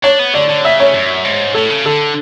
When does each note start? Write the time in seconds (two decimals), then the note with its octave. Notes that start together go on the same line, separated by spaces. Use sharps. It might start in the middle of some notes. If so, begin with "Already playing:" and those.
0.04 D4 C#5
0.19 B3
0.34 D3 D5
0.49 D3
0.65 C#3 E5
0.80 C#5
0.94 F#2
1.25 G#2
1.54 A2 A4
1.70 C#3
1.85 D3 A4